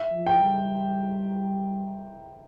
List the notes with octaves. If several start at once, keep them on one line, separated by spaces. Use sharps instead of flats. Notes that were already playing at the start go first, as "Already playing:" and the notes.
Already playing: E5
F3
G5
G3